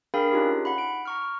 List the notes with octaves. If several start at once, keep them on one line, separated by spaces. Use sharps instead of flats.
D4 G#4 A#4 F5 G5 B5
C#4 D#4 F4 G4
F#5 B5
D7
A#5 C#6 F6